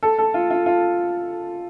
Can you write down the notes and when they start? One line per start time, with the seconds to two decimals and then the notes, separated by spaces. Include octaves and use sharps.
0.03 A4
0.18 A4
0.34 F4
0.50 F4
0.66 F4